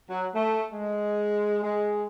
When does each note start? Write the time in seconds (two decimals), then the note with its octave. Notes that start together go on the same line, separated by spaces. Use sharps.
0.10 F#3
0.35 A3
0.73 G#3
1.63 G#3